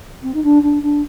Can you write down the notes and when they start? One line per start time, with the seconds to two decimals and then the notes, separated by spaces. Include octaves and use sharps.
0.23 C4
0.34 D#4
0.43 D4
0.62 D4
0.82 D4